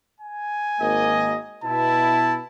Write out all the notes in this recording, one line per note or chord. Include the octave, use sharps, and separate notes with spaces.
G#5
G#1 A#3 D#5
B2 E4 A5